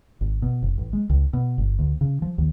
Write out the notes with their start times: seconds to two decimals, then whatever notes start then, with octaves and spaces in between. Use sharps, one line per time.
0.21 G#1
0.42 B2
0.62 F1
0.78 A1
0.93 G#3
1.10 C#2
1.33 B2
1.58 G1
1.79 D2
2.01 C#3
2.22 F3
2.38 D#2